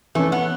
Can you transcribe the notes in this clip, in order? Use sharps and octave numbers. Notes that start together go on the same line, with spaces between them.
E3 A3 C#4
B3